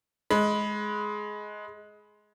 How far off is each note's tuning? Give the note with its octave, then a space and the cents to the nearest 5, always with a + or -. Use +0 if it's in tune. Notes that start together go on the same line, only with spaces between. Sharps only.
G#3 +15 B5 +0